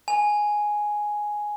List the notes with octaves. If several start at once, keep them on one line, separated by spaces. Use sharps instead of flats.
G#5